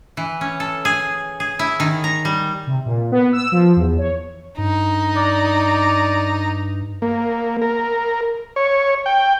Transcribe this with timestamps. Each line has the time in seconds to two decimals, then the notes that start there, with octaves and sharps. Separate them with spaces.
0.17 E3
0.41 C#4
0.60 A4
0.85 G#4
1.40 G#4
1.59 E4
1.80 D#3
2.04 A#5
2.25 G3
2.67 C3
2.86 A#2
3.12 B3
3.33 E6
3.52 F3
3.76 E2
3.98 C#5
4.58 G2 D#4
5.16 D5
7.02 A#3
7.62 A#4
8.56 C#5
9.06 G5